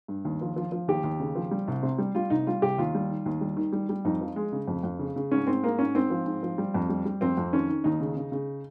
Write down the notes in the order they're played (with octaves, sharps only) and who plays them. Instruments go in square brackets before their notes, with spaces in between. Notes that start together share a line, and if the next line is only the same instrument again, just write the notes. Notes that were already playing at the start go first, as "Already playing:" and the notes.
[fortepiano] G2
D#2
F3
F3
F3
D#2 G4
D#2
C#3
F3
G3
C2
C3
G3
G3 F4
C2 D#4
G3 F4
C2 G4
D#2 F4
G3
D#3
D#2
G3
D#3
G3
G3
F2 D#4
F3
G#3
C#3
F2
F2
C#3
C#3
G#2 C#4
G#2 C4
G#3 A#3
G#2 C#4
G#2 C4
F3
G#2
F3
G3
F2
G3
G3
F2 C4
F2
D#3 C#4
D#3
D#2 D#4
C#3
C#3
C#3